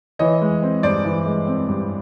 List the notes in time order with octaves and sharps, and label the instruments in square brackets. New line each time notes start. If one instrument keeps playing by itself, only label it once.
[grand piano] E3 C#5 D#5
G#3
C4
G2 C5 D5
E3
G#3
C4
G2